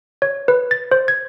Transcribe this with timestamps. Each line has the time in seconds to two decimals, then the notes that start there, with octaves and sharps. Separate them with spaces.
0.22 C#5
0.48 B4
0.71 A6
0.92 C5
1.08 G#6